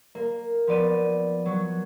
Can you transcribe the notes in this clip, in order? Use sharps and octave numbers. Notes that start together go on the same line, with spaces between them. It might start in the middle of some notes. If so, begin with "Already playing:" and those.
A#3
F3 B3 D5 D#7
F#3 F#4